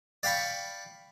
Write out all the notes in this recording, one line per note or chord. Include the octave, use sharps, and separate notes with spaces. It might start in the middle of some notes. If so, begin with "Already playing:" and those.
D5 F5 G5 B5 C#6